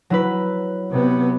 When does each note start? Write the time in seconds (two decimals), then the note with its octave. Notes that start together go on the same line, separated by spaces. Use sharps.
0.10 F#3 E4 B4
0.91 C3 B3